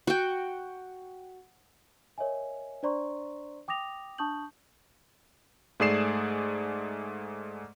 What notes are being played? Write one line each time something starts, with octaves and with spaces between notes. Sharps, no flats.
F#4 G5
A#4 C#5 D#5 E5 G#5
D4 C5 D5 A#5 C6 C#6
G5 D6 D#6 A#6 F7
D4 A5 C#6 D#6 G6 F#7
G#2 A3 G#4 D5 C7 E7